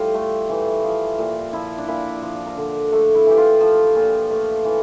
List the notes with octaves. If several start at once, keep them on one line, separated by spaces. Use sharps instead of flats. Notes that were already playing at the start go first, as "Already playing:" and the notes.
Already playing: A2 G3 F4 G4 C5
A3
E3
F3
A#2
F3 E4
D4
A#2 E4
F3
A#4
D3
A3 A4
E4
E3 G4
F4
F3
A#2
A3
E3